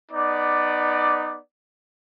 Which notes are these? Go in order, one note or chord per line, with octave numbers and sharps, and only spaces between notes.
B3 D#4 D5